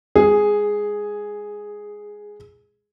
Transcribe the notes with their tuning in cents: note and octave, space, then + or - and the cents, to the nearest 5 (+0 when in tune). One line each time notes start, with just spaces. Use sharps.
G#3 -20 G#4 +0